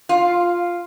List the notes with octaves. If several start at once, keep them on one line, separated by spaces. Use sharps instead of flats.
F4